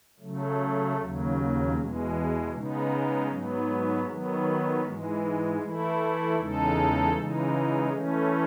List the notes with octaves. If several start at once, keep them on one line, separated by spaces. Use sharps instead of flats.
C#3 F#3 A3
D#2 C#3 F#3
E2 B2 G#3
C#3 G#3 B3 D#4
G#2 F#3 B3
D#3 F#3 B3
G#2 E3 G#3
E3 A3 E4
E2 C#3 G#3 D#4 A4
C#3 E3 G#3 D#4
E3 A3 C#4